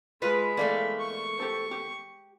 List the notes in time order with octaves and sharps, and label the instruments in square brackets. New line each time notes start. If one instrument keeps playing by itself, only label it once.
[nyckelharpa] G#3 B5 [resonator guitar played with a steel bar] F4 B4 D#5
[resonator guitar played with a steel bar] E2 A3 A#3 [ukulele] D5 F5
[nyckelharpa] C#6
[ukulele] G4 A4 C5
G4